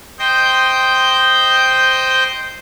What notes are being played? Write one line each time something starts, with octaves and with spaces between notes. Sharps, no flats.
C5 D#5 G5 G6